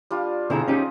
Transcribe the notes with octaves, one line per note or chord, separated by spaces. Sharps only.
G3 D4 F4
B2 D3 C4 E4 G#4 A#5
C#4 D#4 G4